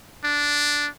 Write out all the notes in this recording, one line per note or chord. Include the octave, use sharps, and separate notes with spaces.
D4